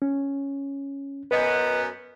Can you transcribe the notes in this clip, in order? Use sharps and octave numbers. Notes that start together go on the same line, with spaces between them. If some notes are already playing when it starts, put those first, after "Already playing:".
C#4
F#2 B3 B4 D#5